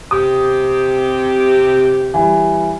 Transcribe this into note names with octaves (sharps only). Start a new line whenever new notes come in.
C3 G4 D#6
E3 G3